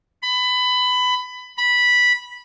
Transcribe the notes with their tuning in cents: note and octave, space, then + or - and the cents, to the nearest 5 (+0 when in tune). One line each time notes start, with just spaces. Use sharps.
B5 +20
B5 -10